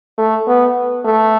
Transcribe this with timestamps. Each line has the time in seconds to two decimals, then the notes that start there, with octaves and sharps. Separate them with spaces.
0.18 A3
0.47 B3
1.05 A3